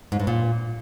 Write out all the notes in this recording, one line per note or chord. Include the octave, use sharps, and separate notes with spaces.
G#2
G2
A#2